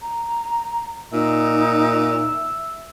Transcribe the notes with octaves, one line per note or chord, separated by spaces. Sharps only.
A#5
A#2 D#4 E5